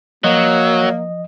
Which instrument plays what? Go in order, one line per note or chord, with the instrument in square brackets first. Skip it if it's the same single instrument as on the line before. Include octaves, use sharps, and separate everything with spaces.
[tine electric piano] F3 D#5 [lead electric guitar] F#3 [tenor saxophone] A#3